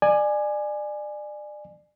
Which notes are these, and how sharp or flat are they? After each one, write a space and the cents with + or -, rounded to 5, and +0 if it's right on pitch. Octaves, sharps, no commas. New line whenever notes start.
D5 +30 G#5 +0